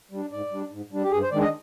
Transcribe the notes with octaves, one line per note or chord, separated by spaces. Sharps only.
G3 D4
G#2 D5
G3 D4
G#2
G3 D4
G4
G2 G#4
C5
D#3 G#3 D4 D5
D#5